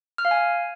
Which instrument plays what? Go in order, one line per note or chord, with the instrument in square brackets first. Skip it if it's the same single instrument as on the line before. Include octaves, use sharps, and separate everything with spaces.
[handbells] F6
F5
G#5